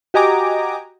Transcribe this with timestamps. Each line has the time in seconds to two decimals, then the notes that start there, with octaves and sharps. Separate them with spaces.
0.14 F#4 G4 D#5 G#5 A#5 D6